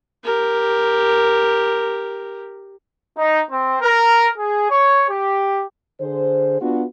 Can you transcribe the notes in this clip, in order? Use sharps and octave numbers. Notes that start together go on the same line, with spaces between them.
G4 A#4
D#4
C4
A#4
G#4
C#5
G4
D3 G#4 C5
B3 D4 F4 F#4